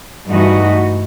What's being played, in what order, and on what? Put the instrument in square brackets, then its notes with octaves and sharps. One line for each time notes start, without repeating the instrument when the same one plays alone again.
[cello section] G2 E3 A3 D#4 F#4